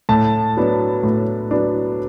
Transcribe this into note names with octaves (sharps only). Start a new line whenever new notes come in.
A2 A5
F#3 B3 D4
A2
F#3 B3 D4